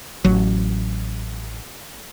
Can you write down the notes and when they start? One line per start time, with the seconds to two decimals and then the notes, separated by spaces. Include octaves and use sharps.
0.25 A1 F#3